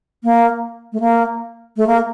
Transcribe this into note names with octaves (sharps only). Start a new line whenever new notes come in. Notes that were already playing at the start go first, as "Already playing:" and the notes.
A#3
A3
A#3
A3
A#3